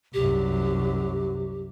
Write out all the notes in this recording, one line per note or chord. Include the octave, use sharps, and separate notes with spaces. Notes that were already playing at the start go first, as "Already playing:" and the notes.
C2 F#2 G4